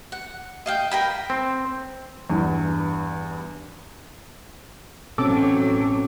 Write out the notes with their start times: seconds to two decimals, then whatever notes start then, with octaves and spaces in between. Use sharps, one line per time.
0.12 F#5
0.66 D#5 F5 G5
0.91 A#4 G5 B5
1.30 C4
2.30 E2 G2
5.18 A1 B2 F#3 C4 C#4 A4 D6